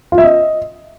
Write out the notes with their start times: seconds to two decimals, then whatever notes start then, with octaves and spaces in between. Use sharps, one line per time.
0.12 F4
0.18 E5
0.24 D#5